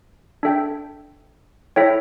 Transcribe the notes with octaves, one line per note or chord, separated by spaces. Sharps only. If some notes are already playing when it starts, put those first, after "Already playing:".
D4 A4 E5 G5
E4 A4 C#5 E5 G5